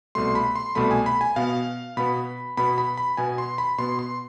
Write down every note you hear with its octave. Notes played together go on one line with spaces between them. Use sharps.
C2 B2 A3 C6
B5
C6
C2 B2 A3 B5
G#5
B5
G#5
B2 B3 F5
B2 B3 B5
B2 B3 B5
B5
B5
B2 B3 G#5
C6
B5
B2 B3 C6
C6